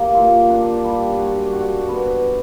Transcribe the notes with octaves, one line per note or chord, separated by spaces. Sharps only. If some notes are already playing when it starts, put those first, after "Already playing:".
Already playing: A#3 G4
A#2
D4
G3
F#4
F#4
B3